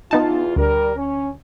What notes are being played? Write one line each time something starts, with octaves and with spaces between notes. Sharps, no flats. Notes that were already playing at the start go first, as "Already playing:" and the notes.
E2 B3 D#4 F4 A5
D2 G3 A#4
C#4